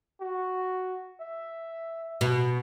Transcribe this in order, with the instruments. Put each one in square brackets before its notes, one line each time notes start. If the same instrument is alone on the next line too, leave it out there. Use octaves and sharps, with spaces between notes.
[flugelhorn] F#4
E5
[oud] B2